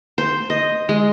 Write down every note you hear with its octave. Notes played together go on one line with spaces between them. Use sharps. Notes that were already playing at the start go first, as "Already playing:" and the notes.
C5
D#5
G#3